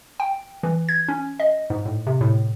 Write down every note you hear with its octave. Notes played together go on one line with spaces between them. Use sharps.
G5
E3
G#6
C#4
D#5
G#2
A2
C3
A2